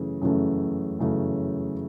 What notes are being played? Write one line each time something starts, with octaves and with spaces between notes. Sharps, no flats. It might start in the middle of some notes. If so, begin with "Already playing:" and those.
Already playing: F#2 C#3 E3 A3
F#2 C#3 E3 A3
F#2 C#3 E3 A3